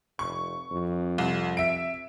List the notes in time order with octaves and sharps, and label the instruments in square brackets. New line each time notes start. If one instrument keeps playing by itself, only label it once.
[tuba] F1 [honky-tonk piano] C#6
[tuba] F2
[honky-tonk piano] C2
E5 D7